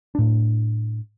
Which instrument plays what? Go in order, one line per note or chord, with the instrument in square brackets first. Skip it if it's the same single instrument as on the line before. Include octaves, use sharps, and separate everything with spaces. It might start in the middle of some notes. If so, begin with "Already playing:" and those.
[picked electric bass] A2 D4